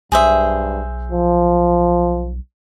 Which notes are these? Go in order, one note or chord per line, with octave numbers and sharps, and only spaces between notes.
B1 G2 G#4 C5 E5
F3